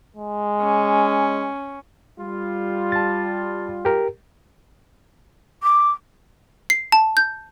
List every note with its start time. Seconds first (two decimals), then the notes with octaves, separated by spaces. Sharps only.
0.17 G#3
0.61 C#4
2.18 G3 F4
2.92 A5 A6
3.85 G4 A#4
5.63 D6
6.70 C7
6.92 A5
7.17 G6